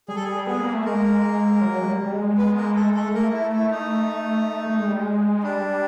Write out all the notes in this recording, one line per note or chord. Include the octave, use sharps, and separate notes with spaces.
G3 G#4
A4
G#4
B3 G#4
A#3
A3
G#3 A#3 A#4
F#3
G#3
G3
G3
G#3
B3 B4
A#3 A#4
A3 A4
A3 A4
G#3
A3 A#3 A#4
E4
E4
D#4
A3
G#3
G3
G#3
G3 D4